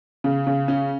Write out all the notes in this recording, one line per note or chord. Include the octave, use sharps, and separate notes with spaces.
C#3
C#3
C#4